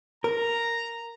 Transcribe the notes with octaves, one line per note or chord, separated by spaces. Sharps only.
A#4 A#5